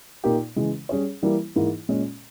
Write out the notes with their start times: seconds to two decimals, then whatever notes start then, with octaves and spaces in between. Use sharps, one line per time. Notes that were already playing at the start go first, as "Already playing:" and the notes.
0.24 A#2 A#3 D#4 G4
0.56 C#3 E3 G#3
0.89 G3 C#4 G#4 C#5
1.23 E3 G3 A#3 E4
1.56 G#2 E3 A#3 E4
1.89 A#2 G#3 C#4